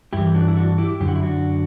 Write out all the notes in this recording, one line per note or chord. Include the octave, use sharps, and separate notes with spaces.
G2 E3 E4 G4
D4 F#4
E4
D4 F#4
E4 G4
F#2 D3 G4
F#4
E4
D4 F#4